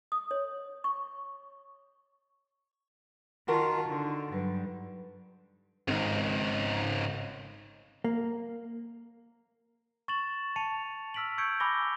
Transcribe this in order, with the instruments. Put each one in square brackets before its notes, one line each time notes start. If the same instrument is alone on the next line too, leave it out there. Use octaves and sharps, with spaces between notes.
[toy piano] D#6
C#5
C#6
[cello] D#3 F4 [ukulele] F#4 A#4 F#5 [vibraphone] A5 A#5 C6
[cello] D3 [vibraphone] D#4
[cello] G2 [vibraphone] F#3 B4
[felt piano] G#1 [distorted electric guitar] C#2 G#2
[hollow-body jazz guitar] A#3
[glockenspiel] C#6 A6 E7 F#7
A5 C#7 D#7 F7
E6 F6 B6 D7 F#7
C#6 E6 G6 G#6 C#7 D7
G#5 B5 D6 E6 A#6 G7